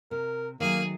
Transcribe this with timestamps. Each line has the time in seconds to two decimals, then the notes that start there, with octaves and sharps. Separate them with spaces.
0.11 C3 A#4
0.60 D#3 F#3 A3 A#3 G#4